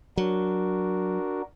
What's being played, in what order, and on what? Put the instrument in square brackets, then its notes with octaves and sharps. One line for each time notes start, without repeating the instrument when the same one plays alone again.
[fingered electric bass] F#3 [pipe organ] D4 F#4 A#4